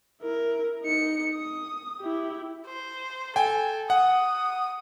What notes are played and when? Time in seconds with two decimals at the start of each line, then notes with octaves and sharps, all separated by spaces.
0.22 E4 A#4
0.82 D#4 C#7
1.35 D#6
2.00 E4 G4
2.67 C5
3.36 A4 G5 G#5
3.90 F#5 D#6